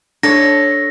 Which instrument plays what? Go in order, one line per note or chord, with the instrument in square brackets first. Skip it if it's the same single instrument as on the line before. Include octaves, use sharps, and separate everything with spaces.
[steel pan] D4 [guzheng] A4 C#5 [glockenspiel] A#6